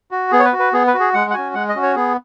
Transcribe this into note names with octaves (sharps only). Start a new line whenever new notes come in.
F#4
B3 G#4
C#5
B4
F#4
B4
B3 G#4
B4
F#4
G#4
G#3 F#5
F#5
C#4 F#4 G#5
G#3 F#5
D#5
C#4 F#4
C#5
B3 G#4